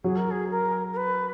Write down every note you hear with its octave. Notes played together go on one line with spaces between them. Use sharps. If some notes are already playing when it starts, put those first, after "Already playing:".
F#3 G#4
A#4
G#4
A#4
A#4
B4